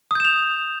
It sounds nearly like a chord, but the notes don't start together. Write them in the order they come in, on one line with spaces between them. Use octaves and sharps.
D#6 G6 E7 F7